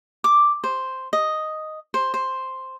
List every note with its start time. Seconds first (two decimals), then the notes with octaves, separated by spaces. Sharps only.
0.24 D6
0.64 C5
1.13 D#5
1.94 C5
2.14 C5